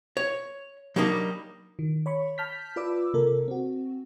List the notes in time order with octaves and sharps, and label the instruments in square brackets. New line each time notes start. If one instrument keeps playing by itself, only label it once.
[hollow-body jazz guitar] C#5
F#3 G3 A#3 D4 D#4
[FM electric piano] D#3
C#5 B5 C#6
A5 F6 G6 B6
F4 B4 D5 D6 E6
C3 A#3 A4 A#4
C4 F#4